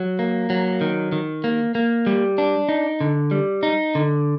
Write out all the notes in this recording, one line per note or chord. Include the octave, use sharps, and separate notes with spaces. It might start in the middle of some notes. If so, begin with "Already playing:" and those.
Already playing: F#3
A#3
F#3
D#3
D#3
A#3
A#3
G3
D4
D#4
D3
G3
D#4
D3